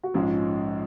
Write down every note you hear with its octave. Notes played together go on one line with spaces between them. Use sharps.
F#4
A#1 G#2 F3 G#3 C#4 F4